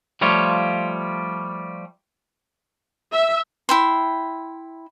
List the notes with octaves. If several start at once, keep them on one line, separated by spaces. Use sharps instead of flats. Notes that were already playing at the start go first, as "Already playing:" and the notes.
F3 G3 A3 F4 C#5
E5
E4 G5 C6